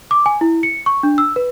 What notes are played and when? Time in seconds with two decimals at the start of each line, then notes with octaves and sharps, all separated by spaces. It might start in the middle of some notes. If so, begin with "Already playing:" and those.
0.11 D6
0.26 G#5
0.41 E4
0.63 C#7
0.86 C#6
1.03 D4
1.18 E6
1.36 B4